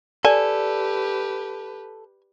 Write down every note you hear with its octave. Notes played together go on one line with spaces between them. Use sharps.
G4 A4 B4 D5 G#5